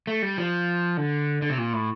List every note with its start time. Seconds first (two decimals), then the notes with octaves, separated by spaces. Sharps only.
0.07 A3
0.22 G3
0.38 F3
0.97 D3
1.42 D3
1.50 C3
1.58 A#2
1.73 A2